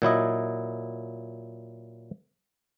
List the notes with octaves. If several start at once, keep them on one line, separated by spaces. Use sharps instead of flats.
A#2 F#3 E4 D#5